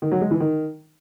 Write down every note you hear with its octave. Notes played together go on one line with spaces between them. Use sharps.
D#3
F#3
G#3
E3
D#3